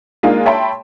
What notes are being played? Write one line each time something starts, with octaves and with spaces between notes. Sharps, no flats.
G#3 A#3 D4 D#4 F4 G#4
C#5 E5 G5 A5 B5 C6